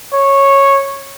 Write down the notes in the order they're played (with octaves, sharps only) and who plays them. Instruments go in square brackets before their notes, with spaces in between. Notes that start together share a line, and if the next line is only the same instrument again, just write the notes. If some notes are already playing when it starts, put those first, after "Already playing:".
[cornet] C#5